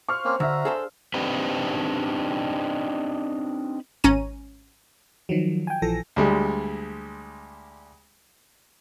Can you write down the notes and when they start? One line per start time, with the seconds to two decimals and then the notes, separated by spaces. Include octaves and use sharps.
0.08 C5 F5 C6 C#6 F6
0.25 A#3 C4 C#4 D#5 F5
0.40 D3 F#4 E5 A#5 E6
0.65 D4 G#4 A4 C5 F5
1.14 C4 D4 D#4 G4 B4 C5
4.04 G#1 C#4 A#5 D#7
5.29 D#3 F3 F#3
5.67 G5 G#5
5.82 A#1 E3 F3 A4 A#6
6.16 D2 G3 G#3